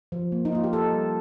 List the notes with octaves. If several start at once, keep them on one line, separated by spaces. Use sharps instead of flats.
F3
A#3
D#4
A#3 F4
G4
A#3 A4
G3